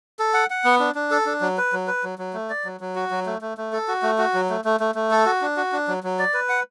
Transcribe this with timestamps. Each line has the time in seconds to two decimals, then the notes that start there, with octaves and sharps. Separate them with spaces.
0.19 A4
0.34 F#5
0.50 F#5
0.65 B3
0.80 D4
0.95 D4
1.11 A4
1.26 D4
1.41 F#3
1.58 B4
1.73 F#3
1.87 B4
2.04 F#3
2.19 F#3
2.34 A3
2.50 D5
2.65 F#3
2.81 F#3
2.96 F#4
3.11 F#3
3.26 A3
3.42 A3
3.58 A3
3.73 A4
3.88 F#4
4.03 A3
4.18 F#4
4.34 F#3
4.50 A3
4.65 A3
4.80 A3
4.95 A3
5.11 A4
5.26 F#4
5.42 D4
5.57 F#4
5.72 D4
5.88 F#3
6.03 F#3
6.19 D5
6.34 B4
6.49 F#5